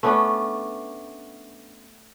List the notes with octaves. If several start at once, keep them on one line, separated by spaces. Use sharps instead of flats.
A3 B3 C#4 D4